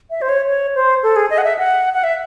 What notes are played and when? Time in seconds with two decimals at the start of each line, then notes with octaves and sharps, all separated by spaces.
0.10 E5
0.22 C5
0.29 C#5
0.47 C#5
0.75 C5
1.03 A4
1.16 G#4
1.30 D#5
1.38 F#5
1.44 E5
1.59 F#5
1.94 F#5
2.04 E5